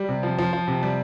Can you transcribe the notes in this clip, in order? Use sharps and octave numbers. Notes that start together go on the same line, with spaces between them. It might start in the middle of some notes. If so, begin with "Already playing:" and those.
Already playing: G3
C3
F3
F3
F3
C3
G3